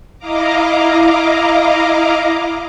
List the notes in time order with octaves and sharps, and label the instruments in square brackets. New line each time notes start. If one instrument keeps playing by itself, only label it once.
[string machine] E4 D#5 F5 A#5 D6